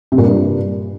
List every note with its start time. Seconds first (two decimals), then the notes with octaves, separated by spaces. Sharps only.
0.12 C3
0.18 A#2
0.24 G2